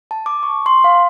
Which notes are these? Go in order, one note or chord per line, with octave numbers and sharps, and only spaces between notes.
A5
D6
C#6
C6
F5